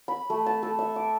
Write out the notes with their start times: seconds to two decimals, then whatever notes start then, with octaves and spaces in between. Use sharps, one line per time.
0.08 B5
0.30 A3
0.46 A5
0.63 A4
0.79 E5
0.96 D6